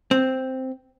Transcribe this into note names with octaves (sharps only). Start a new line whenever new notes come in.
C4